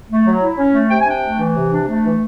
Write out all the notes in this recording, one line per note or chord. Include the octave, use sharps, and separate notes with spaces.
A3
F#3
E4
C#4
A3
C3 G5
G#5
D4 G5
A3
E3
C3
D4
A3
E3